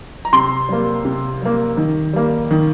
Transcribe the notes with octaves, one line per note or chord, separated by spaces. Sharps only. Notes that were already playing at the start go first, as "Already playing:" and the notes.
A#5
C3 C6
G3 A#3
C3
G3 A#3
D#3
G3 A#3
D#3